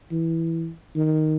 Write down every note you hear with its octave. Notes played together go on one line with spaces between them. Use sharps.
E3
D#3